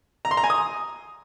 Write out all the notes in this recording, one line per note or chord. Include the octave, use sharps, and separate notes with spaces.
A#5
C6
A#5
G#5
D#6